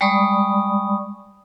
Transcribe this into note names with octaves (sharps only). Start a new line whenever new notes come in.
G3 G#3 D5 B5 C#6 D#6